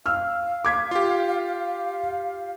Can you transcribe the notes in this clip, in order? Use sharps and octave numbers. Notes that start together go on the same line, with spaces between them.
F5 E6 F6
D6 G#6 B6
F4 G4